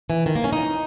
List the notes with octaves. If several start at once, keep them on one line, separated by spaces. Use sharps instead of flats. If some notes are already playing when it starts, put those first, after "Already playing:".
E3
D#3
A#3
C#4
D#4